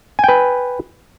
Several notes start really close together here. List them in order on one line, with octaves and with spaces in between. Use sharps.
G#5 G5 B4